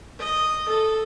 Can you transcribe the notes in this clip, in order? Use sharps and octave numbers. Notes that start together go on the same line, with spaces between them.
D#5
A4